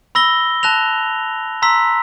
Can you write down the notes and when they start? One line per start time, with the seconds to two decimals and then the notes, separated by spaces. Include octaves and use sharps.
0.15 B5 E6 A#6 G7
0.63 A5 F#6 A#6 F7
1.62 A#5 C6 E6 B6